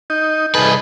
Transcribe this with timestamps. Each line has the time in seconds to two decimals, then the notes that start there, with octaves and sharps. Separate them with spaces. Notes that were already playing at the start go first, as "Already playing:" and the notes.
0.10 D#4 G6
0.55 C2 D#4 G#4 A4 B4